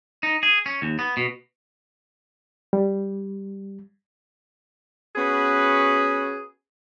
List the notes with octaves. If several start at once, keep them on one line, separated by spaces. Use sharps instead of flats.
D#4
G#4
C#4
D#2
B3
B2
G3
B3 C#4 F#4 G#4 B4